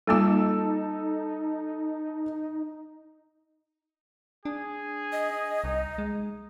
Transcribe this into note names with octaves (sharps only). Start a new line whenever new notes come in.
G3 A#3 D#4 F4 A4 E6
D4 G#4
D#5
C2 D#4
G#3